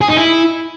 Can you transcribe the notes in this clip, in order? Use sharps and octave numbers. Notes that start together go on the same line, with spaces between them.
G#4
D#4
E4